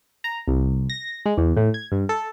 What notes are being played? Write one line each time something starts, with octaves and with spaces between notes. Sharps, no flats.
A#5
C2
A#6
G#3
E2
A2
G#6
G2
A4